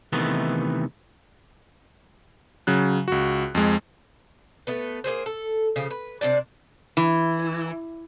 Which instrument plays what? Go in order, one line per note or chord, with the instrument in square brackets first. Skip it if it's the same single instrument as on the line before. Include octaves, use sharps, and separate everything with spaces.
[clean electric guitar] C3 D#3 E3 A3 B3 D#4
[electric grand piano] C#3 F#3 F#6
C#2 F#4
F2 G#3
[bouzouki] A3 B3 B4
A#3 B3 G#4 C5
A4
C#3 F3
B4
C3 C#4 D4 D5
[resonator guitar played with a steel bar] E3